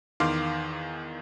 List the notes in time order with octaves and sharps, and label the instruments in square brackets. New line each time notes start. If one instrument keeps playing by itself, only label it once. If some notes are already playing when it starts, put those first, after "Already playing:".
[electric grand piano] E2 D#3 F5 C6 D6 F6